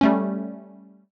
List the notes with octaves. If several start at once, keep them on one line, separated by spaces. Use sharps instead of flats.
G3 A3 C#4